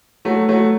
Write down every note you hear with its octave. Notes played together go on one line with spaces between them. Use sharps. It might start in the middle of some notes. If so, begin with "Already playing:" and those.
F#3 A3
F#3 A3